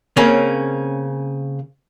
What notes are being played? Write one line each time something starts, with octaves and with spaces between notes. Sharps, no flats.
C#3 A#3 C4 C#4